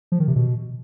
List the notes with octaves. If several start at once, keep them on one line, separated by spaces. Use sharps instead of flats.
F3
D#3
C3
B2